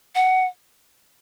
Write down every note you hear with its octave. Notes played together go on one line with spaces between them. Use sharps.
F#5